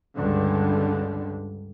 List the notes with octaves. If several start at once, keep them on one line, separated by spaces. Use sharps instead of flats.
C#2 G2 D3